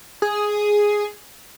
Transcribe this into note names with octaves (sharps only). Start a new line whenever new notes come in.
G#4